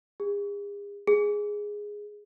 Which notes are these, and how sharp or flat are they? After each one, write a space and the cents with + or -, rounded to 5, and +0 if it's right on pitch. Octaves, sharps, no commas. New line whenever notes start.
G#4 -40
G#4 -5